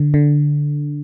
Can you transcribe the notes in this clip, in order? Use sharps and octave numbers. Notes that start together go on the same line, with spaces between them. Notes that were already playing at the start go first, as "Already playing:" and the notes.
Already playing: D3
D3